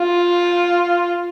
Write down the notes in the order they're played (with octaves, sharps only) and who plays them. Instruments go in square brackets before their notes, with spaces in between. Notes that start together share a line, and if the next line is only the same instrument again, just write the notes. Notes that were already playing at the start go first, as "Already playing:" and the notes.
Already playing: [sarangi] F4